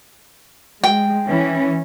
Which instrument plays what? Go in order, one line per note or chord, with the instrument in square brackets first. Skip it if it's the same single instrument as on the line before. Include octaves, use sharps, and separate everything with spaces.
[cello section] G#3 [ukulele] G5
[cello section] E3 C#4